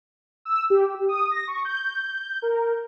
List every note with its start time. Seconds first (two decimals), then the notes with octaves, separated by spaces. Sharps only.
0.45 E6
0.70 G4
1.09 D#6
1.31 A#6
1.48 C#6
1.65 G6
2.42 A#4